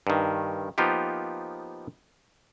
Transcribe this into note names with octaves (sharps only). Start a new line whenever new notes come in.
G2 D#3
F3 A#3 B3 D#4 F4 G4